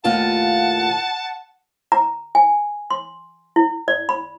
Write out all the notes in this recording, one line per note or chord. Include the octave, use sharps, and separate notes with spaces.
D#2 A2 F4 F#5 A5
A#5
G#5
C6
E4
D5
B5